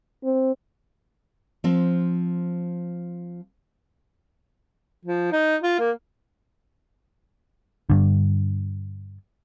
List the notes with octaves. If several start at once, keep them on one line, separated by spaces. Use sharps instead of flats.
C4
F3 C4
F3
D#4
F4
A#3
G2 D3